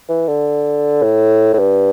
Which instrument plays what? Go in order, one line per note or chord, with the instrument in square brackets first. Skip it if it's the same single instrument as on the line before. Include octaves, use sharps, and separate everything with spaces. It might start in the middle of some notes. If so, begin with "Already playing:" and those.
[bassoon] E3
D3
A2
A2
G2